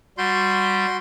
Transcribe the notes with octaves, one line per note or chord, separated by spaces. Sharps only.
G3 F#4 C6 G6